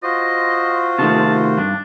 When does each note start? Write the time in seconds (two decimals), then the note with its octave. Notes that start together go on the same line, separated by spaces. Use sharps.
0.03 F4 F#4 C5 D#5
0.99 C3 D#3 A3 A5
1.58 G2 D4